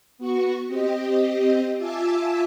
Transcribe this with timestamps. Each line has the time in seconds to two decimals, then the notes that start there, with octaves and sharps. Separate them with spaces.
0.18 B3 F#4 C#6
0.68 C4 G4 D#5
1.78 F4 E5 G#5 A5 D6 E6